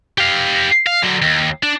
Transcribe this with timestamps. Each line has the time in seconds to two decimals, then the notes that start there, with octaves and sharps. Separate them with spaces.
0.18 G4 F5
0.87 F5
1.02 D3 F#3
1.22 D#2
1.63 D4